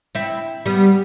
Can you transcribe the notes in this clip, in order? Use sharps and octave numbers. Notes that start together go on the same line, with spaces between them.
C4 E4
G3 B3